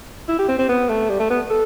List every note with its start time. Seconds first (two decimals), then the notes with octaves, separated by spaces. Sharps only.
0.28 E4
0.39 G4
0.49 C4
0.59 C4
0.69 B3
0.89 A3
1.09 G3
1.20 A3
1.30 B3
1.50 A4